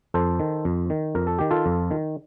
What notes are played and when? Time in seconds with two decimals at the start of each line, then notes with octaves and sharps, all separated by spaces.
0.14 F2 A4 C5
0.40 D#3
0.65 F2
0.90 D#3
1.15 F2 A#4
1.27 A4
1.39 D#3 G4
1.51 F4 A4
1.66 F2
1.91 D#3